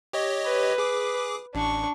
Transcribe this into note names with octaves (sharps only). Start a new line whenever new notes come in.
G4 C#5 D#5
B4
G#4 D6
A1 D4 C#6